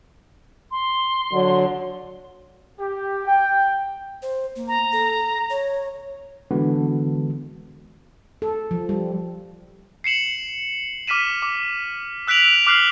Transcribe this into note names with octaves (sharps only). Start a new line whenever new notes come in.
C6
D3 F#3
G4
G5
C5
A#3
A#5
A4
C#5
D3 E3 G#3 B3 D4 F#4
A4
F3
G3
C7 C#7 E7 F#7
D6 F6 B6 D#7 E7
D6
E6 F#6 B6 D7 F7 F#7
D6 F6 F#6 C7 F#7